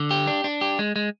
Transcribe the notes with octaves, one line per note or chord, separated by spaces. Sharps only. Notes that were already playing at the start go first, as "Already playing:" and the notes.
Already playing: D3
G4
D4
D4
G4
G#3
G#3